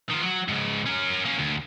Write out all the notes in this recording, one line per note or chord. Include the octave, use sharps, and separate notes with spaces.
D#3 F4
F#3 F#4
G#2 C#3
C#4 A#4
A#3 C#4
D2